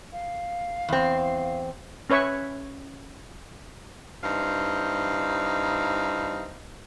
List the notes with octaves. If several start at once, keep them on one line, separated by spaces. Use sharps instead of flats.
F5
E2 C4
C#4 B4 C#5 E5 C#6
G2 C4 D#4 E4 F5